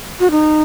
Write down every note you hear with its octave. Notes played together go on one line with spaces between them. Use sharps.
F#4
D#4